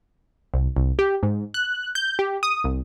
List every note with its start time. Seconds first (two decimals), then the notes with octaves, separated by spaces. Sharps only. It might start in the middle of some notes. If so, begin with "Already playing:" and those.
0.54 C2
0.77 C2
0.99 G4
1.23 G#2
1.54 F#6
1.95 G6
2.19 G4
2.43 D#6
2.64 C2